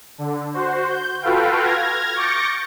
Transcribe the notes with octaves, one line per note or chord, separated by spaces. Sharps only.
D3
F#4 C5
G6
F4 F#4 A4 B4 F5 G5
F6 G#6 A#6
C#6 D6 G6 A6 A#6 C#7